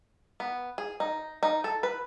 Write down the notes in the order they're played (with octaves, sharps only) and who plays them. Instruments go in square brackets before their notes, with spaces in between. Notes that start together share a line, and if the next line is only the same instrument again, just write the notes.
[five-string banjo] B3
G#4
D#4
D#4
A4
B4